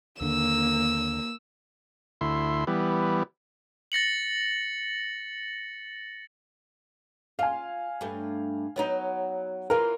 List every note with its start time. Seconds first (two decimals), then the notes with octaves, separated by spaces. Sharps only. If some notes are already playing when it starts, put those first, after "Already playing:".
0.21 D#2 D3 A#3 E6
2.21 D2 E4 C6
2.67 E3 G3 B3
3.92 A6 A#6 C#7 F#7
7.39 F4 F5 G#5
8.01 G2 A3
8.76 F#3 B3 D#4
9.70 E3 F4 A#4